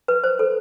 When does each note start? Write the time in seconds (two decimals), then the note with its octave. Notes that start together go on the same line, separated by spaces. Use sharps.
0.08 B4
0.24 C5
0.39 A4